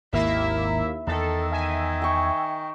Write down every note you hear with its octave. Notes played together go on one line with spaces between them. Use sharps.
G#1 D#2 A#3 E4 E5
E2 D#3 E3 A4
E5 G#5
G5 C#6